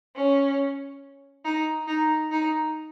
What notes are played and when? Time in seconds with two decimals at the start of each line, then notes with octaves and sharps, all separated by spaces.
0.15 C#4
1.45 D#4
1.87 D#4
2.31 D#4